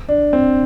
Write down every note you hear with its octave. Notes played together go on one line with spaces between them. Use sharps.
D4
C4